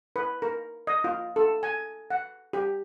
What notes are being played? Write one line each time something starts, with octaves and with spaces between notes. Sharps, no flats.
B4
A#4
D#5
F4
A4
G#5
F#5
G4